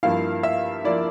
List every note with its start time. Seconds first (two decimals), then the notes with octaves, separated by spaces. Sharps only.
0.03 G2 F3 A#3 E4 F5
0.43 E5
0.85 F3 A#3 E4 D5